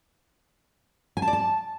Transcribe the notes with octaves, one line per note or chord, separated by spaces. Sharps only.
G#5
A5
D5
A5